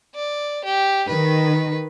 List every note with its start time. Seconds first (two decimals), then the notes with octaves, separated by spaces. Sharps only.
0.15 D5
0.64 G4
1.09 D#3 B4